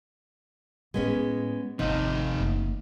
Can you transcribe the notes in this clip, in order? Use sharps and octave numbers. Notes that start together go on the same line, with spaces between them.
A2 G#3 B3 C#4 F4
G#1 D#2 C3 F3 D#4
F#1 D2